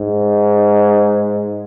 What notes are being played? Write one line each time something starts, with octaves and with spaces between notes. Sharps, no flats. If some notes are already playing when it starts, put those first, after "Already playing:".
Already playing: G#2